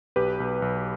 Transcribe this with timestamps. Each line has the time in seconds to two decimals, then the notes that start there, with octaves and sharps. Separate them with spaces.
0.16 B1 G4 B4
0.40 B1
0.62 B1